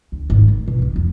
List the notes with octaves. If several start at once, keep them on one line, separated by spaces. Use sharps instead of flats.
D2
G#1
G#2
B2
C#2 D#3
F2